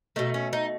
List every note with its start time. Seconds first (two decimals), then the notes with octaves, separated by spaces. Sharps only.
0.16 B2 A3 D#4
0.34 C#4
0.53 D#4